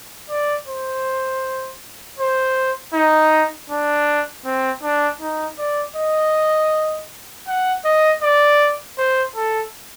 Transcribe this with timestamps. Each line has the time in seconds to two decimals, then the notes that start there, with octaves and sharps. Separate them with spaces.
0.30 D5
0.68 C5
2.19 C5
2.93 D#4
3.70 D4
4.45 C4
4.83 D4
5.20 D#4
5.59 D5
5.96 D#5
7.47 F#5
7.85 D#5
8.22 D5
8.98 C5
9.36 A4